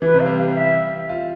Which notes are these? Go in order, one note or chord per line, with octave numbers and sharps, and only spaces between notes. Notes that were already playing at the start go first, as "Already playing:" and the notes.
E3 B4
C3
F5
G3
F5
E5
F4